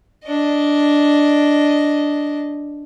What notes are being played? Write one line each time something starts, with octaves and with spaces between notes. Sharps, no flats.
D4 D#5